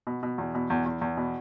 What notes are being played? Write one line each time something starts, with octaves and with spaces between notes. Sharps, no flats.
B2
B2
E2
B2
E2
E2
E2
B2